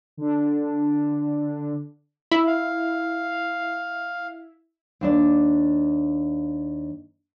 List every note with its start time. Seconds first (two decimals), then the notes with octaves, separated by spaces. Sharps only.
0.17 D3 D4
2.31 E4
2.47 F5
5.01 D#2 D4 D5